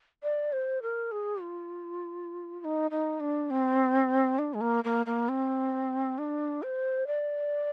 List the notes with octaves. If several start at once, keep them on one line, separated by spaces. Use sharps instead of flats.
D5
C5
A#4
G#4
F4
F4
D#4
D#4
D4
C4
D4
G#3
A#3
A#3
A#3
C4
D4
C5
D5